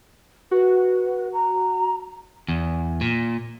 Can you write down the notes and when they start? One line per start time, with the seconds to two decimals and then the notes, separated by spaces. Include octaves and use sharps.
0.51 F#4 B4
1.32 A#5
2.48 E2
3.01 A#2